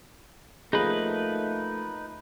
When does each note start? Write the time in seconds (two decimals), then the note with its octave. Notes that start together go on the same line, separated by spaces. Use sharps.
0.73 F3 A3 A#3 D#4 G#4 B4